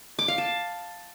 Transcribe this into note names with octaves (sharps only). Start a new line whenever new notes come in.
D6
F5
A5